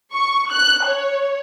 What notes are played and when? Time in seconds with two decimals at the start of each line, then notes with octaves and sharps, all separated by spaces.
0.12 C#6
0.50 F#6
0.86 C#5